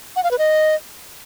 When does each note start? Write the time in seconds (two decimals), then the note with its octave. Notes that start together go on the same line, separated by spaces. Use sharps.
0.16 F#5
0.24 F5
0.31 B4
0.39 D#5